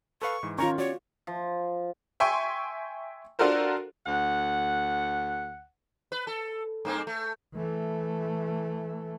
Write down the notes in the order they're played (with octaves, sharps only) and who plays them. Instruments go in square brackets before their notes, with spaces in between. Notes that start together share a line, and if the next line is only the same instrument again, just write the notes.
[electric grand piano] A4 B4 F5 [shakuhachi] C#6
[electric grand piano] G#2 E3
[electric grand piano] D#3 C#5 [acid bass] C#4 [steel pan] F4 C#6 [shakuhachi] A#5
[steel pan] F#4 [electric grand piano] G4 D5 [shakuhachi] C#5
[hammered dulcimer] F3
[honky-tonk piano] E5 G5 G#5 C6 C#6
D4 F4 F#4 A4 A#4 C5
[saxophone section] D2 F#5
[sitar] B4
A4
G2 A#3 C4
A3
[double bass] E3 A3